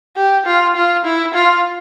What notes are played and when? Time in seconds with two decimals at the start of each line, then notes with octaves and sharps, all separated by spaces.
0.16 G4
0.46 F4
0.76 F4
1.05 E4
1.34 F4